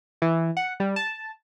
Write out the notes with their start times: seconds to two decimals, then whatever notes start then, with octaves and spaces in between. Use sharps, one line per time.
0.22 E3
0.57 F#5
0.80 G3
0.96 A5